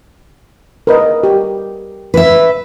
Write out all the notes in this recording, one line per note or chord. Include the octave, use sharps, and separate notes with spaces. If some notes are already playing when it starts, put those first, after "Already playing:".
A#4 B4 D#5
G4
B4 E5